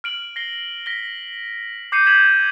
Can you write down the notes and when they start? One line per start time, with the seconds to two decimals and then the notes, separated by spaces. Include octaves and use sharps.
0.04 F6 D7 F#7
0.36 A#6 C7 G7
0.86 A#6 B6 G7
1.92 D6 G6 C7 C#7 D#7
2.06 G6 G#6 B6 C7 E7 F#7